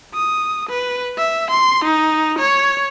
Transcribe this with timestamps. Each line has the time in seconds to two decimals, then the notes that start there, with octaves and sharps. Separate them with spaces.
0.14 D#6
0.70 B4
1.18 E5
1.51 C6
1.85 D#4
2.39 C#5